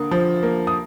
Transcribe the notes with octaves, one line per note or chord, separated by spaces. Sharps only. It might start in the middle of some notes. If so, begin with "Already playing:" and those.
Already playing: D3 A#3 D#6
F3
A#3
D#6